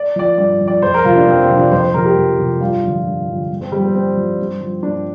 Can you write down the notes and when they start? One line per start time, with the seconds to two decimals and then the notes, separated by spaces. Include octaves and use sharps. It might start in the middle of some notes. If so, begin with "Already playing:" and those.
Already playing: D5
0.16 F3 D5
0.38 G2 D5
0.61 F3
0.68 D5
0.82 F2 C5
0.94 A#4
1.05 C3 F3 F4
1.16 D4
1.26 F2 C4
1.42 C4
1.49 C3 F3
1.57 D4
1.72 F2 C5
1.83 C5
1.94 C3 F3 A#4
2.05 G4
2.17 F2
2.38 C3 F3
2.61 G2 F4
2.83 D3 F3
3.05 G2
3.28 D3 F3
3.50 G2
3.61 C4
3.72 F3 G3
3.83 C4
3.94 G2 C4
4.17 F3
4.39 G2
4.61 F3
4.83 G2 D4